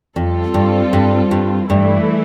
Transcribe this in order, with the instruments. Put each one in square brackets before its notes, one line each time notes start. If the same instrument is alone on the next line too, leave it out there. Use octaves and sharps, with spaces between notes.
[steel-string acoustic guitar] F2 [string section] G3 C4 F4 A4
[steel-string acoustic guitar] G2
G2
G2
[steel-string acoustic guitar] G2 [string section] E3 A3 E4